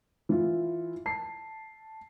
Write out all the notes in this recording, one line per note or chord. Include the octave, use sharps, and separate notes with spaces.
E3 E4 F4
A5 C7